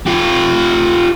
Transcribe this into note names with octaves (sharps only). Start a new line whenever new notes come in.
F4 G4